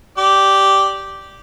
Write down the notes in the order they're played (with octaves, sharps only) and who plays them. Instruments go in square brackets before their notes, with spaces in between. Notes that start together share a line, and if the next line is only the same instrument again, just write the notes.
[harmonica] G4 D5